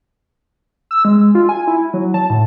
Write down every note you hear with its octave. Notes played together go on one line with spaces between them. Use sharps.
E6
G#3
F4
G#5
E4
F#3
A5
A2